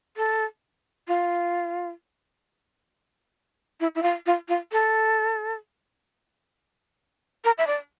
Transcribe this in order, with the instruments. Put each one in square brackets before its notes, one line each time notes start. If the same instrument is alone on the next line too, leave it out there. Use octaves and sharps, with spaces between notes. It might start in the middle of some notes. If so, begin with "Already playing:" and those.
[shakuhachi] A4
F4
E4
E4
F4
F4
F4
A4
A#4
E5
D5